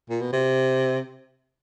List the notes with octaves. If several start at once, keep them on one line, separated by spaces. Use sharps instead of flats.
A#2
B2
C3